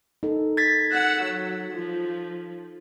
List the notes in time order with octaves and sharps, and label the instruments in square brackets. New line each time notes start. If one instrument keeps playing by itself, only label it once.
[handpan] D#4 A4
[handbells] G#6 A6 B6
[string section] F#5 E6
F#3
F3